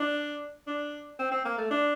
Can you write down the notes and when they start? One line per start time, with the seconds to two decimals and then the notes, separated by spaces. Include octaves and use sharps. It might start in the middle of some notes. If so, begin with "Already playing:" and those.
Already playing: D4
0.67 D4
1.19 C4
1.31 C4
1.45 A#3
1.58 A3
1.71 D4